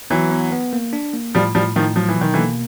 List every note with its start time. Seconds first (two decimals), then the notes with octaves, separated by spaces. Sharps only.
0.10 E3 F#3 B3
0.31 B3
0.52 B3
0.73 A#3
0.93 D4
1.14 A#3
1.35 A2 F3 G3
1.55 A2 F3 G3
1.75 A2 D#3 F3
1.96 F3 F#3
2.09 E3
2.17 B2 D#3
2.33 D3 E3
2.38 A#3